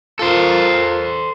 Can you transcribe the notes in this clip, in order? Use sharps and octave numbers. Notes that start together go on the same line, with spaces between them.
F4 A4 A#4 C5